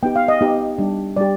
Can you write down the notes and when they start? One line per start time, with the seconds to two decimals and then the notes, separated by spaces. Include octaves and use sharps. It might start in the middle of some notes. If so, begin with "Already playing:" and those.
0.03 B3 D#4 G4 G5
0.16 F5
0.28 D#5
0.41 B3 D#4 G4
0.79 G3 D4 G4
1.17 G3 D4 G4 D5